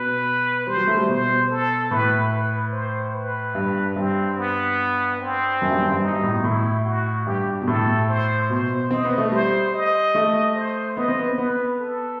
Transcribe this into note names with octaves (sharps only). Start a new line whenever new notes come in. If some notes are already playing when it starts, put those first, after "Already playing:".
Already playing: B2 B4
G3 C5
F#3
A3
G3
B2 C5
A4
A2 B4
B4
C5
B4
G2
G2 C4
B3
C4
F#2
G2
F#2
G2
D#4
G2
A2
B2
A2 E4
F#4
G2 G4
B2
A2 A4
C5
B2 C5
C4 D#5
B3
A3
G3 C5
D#5
A3
C5
B3 D#5
C4
B3
B3 B4
A4